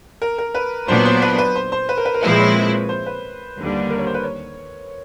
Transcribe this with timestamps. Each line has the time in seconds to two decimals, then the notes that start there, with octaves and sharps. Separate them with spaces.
0.22 A#4
0.38 A#4
0.54 B4
0.88 A#2 F#3 B3 D4 C5
1.05 C5
1.22 B4
1.38 B4
1.56 C5
1.72 C5
1.89 B4
1.97 A#4
2.05 B4
2.14 A#4
2.22 A#2 F3 G#3 C4 E4 B4
2.40 C#5
2.89 C5
3.06 B4
3.57 D#2 D3 G3
3.90 A#4
3.98 C#5
4.07 C5
4.14 B4
4.24 C#5